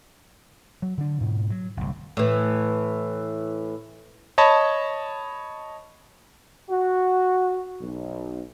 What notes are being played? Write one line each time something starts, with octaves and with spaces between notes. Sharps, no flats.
F#3
D3 D4
G#2 B2
F#3
G1 C2
A2 E3
C#5 D#5 A5 B5
F#4
B1